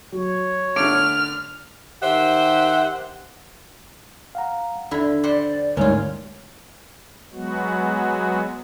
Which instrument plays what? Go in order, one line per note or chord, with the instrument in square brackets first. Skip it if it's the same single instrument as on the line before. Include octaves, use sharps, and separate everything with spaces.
[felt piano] F#3 [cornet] C#5
[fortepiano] D3 A3 D4 [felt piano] D6 D7 [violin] F6
[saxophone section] D#3 G4 C5 E5 F#5
[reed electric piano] F5 F#5 A#5
[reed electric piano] D#2 D4 B5 [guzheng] D3 E4
[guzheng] G4 C5 F#5 [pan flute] D5
[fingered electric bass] D2 G#2 [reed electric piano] G3 A#4 [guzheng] C#4 F4 [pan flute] C#5
[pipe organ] F#3 G#3 B3 F#4